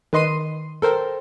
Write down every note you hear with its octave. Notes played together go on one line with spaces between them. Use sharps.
D#3 B4 D#5 C6 C7 D#7
A4 A#4 C5 G5